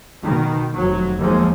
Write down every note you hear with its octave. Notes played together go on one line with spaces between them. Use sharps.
B2 D#3
F1 F#3
D#2 F3 G#3